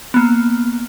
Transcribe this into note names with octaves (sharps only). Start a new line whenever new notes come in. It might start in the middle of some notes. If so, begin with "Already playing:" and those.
A#3 B3